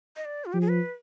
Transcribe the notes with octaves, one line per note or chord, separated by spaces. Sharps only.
D#5
D5
F4
F3 G4
G#4
B4